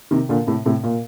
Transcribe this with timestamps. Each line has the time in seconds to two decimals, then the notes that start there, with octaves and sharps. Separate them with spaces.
0.11 C3 D#3
0.29 A#2 D3
0.47 A2 C3
0.66 A2 C3
0.83 A#2